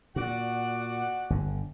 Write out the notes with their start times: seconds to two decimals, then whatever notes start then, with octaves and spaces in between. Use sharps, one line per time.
0.16 A#2 F#4 D5 F#5
1.30 G1 D3